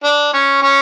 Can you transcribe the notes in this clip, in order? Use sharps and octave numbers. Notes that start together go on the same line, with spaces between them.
D4
C#4
C#4